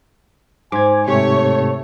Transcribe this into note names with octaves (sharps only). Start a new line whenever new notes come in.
G#2 G#5 D6 G#6
G#2 C3 A3 G4 C#5